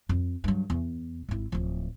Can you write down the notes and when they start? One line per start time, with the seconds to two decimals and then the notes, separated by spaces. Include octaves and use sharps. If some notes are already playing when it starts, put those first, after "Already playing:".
0.09 F2
0.44 G2 F#3
0.70 E2
1.29 G#1 E4
1.52 D1 F3